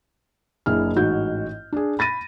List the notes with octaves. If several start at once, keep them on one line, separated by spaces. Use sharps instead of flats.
F#1 D4 E4 G#4 F6
A1 G#2 F#4 G6
D4 G#4
B5 A6 A#6 D#7